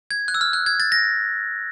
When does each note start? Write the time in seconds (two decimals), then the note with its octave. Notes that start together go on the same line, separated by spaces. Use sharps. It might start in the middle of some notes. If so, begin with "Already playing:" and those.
0.11 G#6
0.28 F#6
0.34 E6
0.41 F6
0.53 F#6
0.66 G#6
0.80 A6
0.92 A#6